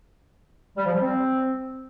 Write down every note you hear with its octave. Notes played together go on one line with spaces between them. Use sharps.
G3
F3
G3
C4